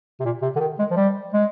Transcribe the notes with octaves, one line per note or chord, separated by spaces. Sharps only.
C3
A#2
C3
D3
D#3
G#3
F3
G3
G#3